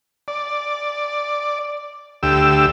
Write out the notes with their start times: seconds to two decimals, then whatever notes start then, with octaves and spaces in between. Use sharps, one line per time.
0.28 D5
2.23 D2 G4 E6